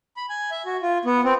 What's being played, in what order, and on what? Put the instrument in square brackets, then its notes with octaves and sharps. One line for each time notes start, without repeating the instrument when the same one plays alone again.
[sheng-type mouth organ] B5
G#5
E5
F#4
F4
B3
C4